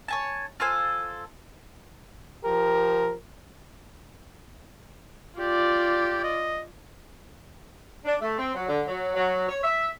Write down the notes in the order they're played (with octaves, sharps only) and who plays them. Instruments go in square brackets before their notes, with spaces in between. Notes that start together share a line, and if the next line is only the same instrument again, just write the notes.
[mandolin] C#5 G#5 A5
F4 A4 C5 G#5
[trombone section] F3 G4 A#4
[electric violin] F4 D5 [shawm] G4
[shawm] D#5
[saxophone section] D4
A3
C4
F#3
D3
F#3
F#3
C#5
E5